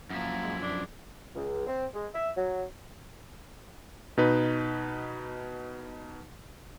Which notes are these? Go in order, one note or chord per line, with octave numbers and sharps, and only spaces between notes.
F#2 F3 A#3 E4
G#3
D4
C#2
C4
G#3
E5
F#3
B2 D#4 B4